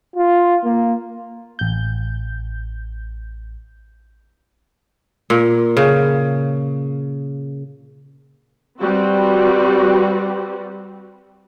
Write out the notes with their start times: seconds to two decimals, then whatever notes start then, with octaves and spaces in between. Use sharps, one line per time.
0.16 F4
0.65 A#3
1.59 A1 G6
5.30 A#2
5.77 C#3
8.80 G3 C4 F#4 B4